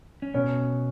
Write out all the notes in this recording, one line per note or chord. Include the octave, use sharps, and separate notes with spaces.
C#4
B2 B3 C#4